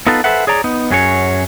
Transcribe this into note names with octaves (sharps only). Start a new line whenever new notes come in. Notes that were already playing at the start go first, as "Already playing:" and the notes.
B3 D#4 F4 A4 B4
A4 B4 C5 E5 F#5
G#4 C#5 D5 A#5
B3 D#4
F#2 F#3 C#4 G#4 C#5